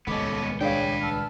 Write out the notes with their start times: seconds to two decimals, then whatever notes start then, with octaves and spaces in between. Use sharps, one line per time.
0.07 D#1 C#2 B3 C#4 A4 D#5 D6
0.61 D4 G#4 B4 C#5 F5 G5
1.01 A5 E6 F6